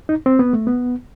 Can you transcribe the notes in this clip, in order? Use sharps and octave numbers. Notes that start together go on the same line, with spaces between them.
D#4
C4
B3
A3
B3